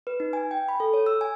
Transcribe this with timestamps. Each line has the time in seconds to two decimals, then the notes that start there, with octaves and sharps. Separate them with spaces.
0.07 B4
0.20 D#4
0.33 G#5
0.51 G5
0.69 B5
0.80 A4
0.94 C#5
1.06 E6
1.21 G#5